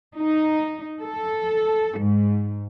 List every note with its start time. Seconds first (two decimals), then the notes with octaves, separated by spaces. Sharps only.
0.16 D#4
1.02 A4
1.99 G#2